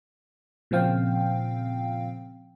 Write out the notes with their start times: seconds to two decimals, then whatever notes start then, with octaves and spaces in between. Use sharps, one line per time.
0.71 A#2 C#3 F3 C4 F5 G5